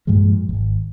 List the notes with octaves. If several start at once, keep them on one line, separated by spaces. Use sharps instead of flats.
G2 A#2 F3 G#3
D#1 G#1